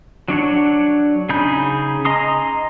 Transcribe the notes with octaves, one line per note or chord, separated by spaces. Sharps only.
F#3 D4 C#5 F#5
C#3 D#4 G#4 B5 G6
D#5 G#5 A#5 C6 D#6